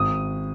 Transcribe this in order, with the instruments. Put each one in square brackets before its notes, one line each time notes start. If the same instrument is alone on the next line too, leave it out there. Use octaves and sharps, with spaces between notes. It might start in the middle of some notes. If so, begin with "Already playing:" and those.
Already playing: [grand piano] G#1 D#6